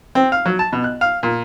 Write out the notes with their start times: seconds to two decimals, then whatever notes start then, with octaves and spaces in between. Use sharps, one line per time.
0.15 C4
0.32 F5
0.46 F#3
0.59 A5
0.73 B2
0.84 F#6
1.01 F5
1.23 A#2